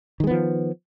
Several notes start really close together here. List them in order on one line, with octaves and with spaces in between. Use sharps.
D#3 G#3 B3 F3